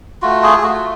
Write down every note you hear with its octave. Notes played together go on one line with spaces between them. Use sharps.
A3 F4 F#4
G#4
G#4
A3 F4 F#4